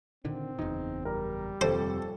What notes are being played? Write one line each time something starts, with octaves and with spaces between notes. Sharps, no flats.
A#2 D3 D#3 C4
F#1 E2 D#4
G3 A#4
D#1 F2 C3 A4 C5